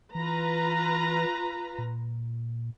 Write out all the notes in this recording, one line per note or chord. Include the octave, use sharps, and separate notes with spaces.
E3 F4 B4 A#5
A#2